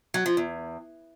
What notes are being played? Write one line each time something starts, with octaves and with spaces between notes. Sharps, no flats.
F#3
F3
E2